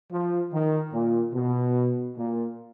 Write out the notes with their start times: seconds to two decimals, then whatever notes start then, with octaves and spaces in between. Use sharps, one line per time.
0.12 F3
0.52 D#3
0.93 A#2
1.34 B2
2.17 A#2